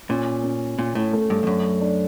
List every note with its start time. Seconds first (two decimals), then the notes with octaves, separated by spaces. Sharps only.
0.09 A#2 C#4
0.44 C#4
0.78 A#2 C#4
0.95 A2
1.13 A3
1.30 G2
1.43 F2
1.47 F#2 D4
1.81 D4